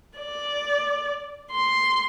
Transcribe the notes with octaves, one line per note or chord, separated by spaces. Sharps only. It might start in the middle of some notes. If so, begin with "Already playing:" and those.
D5
C6